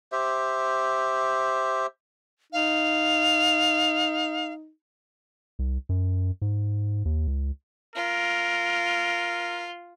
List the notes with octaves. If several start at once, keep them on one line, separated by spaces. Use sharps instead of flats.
G4 C5 E5
D#4 F5
C2
F#2
G#2
D#2
C#2
F4 A#4